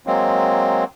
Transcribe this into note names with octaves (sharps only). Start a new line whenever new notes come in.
F#3 G#3 A#3 C4